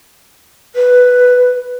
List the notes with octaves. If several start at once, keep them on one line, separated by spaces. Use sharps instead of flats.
B4